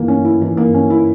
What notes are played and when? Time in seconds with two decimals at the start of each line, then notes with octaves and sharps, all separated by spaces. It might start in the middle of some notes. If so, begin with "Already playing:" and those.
Already playing: E3 A#3
0.08 C#4
0.25 E4
0.42 E3
0.57 A#3
0.74 C#4
0.90 E4